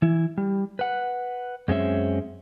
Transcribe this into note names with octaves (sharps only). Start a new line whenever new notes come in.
E3 E4
G3
B4 F#5
F#2 G#3 C4 C#4 E5